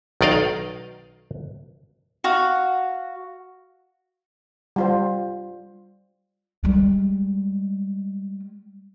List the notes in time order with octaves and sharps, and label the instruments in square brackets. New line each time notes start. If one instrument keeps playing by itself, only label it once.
[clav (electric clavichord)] B1 D#3 D5 D#5 F5
[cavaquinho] F#4 F5
[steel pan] G3 F4 C5
[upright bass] G3 G#3